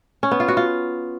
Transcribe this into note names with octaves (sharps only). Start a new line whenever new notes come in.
C#4
B3
F4
F#4
F4